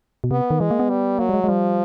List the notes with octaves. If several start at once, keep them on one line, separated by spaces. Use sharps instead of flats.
B2
C3 B3
D#3
E3 G#3
A#3
B3
G3
F#3 A#3
G3
G#3
G#3
F3 G3